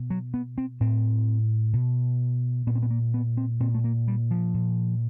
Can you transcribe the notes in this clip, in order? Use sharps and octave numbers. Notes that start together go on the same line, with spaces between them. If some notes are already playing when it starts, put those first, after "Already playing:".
Already playing: B2
F#3
B3
C4
A2 C4
B2
A#2 B3
C4
B3
A#3
B3
C4
A#2 C4
A3
A#3
G3
F3
A#2